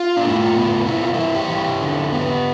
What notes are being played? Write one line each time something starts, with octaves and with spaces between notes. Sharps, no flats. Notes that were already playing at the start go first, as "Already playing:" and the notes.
Already playing: F4
D4
A2 E4
F4
B3
C3 E4
F4
E3 E4
G4
E3
D3
B3